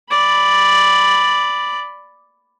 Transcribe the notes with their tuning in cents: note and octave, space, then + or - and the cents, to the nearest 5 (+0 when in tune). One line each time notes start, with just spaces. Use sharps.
D5 +0 B5 +0